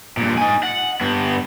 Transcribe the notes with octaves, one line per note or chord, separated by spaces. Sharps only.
G2 A#2
D#4 G#5
F#5
G2 B3